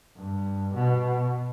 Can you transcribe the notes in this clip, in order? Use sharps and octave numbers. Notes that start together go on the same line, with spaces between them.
G2
B2